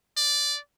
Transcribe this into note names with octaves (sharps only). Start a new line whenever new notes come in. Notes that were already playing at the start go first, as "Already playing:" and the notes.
D5